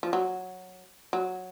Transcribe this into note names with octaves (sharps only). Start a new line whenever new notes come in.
F3
F#3
F#3